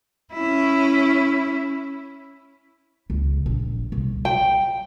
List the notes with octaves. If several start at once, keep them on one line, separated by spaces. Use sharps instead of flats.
C#4 E4
C#2
A#1
C2
G5